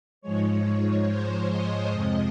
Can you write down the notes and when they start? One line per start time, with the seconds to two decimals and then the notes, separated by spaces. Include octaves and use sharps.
0.21 G#2 F3 G#3 C#5
1.06 C5
1.49 D#5
1.91 F2 C3 F3 G#3